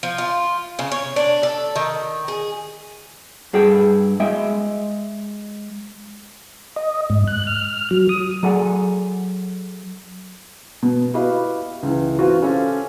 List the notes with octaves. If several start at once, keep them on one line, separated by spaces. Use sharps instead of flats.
F3
F4
C#3
C#5
D4
A4
D#3
G#4
G2 G#4 A4 G5
G#3 E5 G5
D#5
G#2
F#6
F6
F#3
D#6
F#3 G#4 A4 D5 F#5 G#5
B2
E4 F#4 G4 B4 D#5 F5
C#2 E3
E3 C4 F4 F#4
C#4 G4 A4 C5 F5